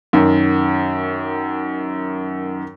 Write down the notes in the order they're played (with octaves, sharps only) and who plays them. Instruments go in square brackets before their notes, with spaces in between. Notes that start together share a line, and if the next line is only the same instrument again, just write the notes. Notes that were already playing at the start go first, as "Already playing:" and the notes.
[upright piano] F#2 D#3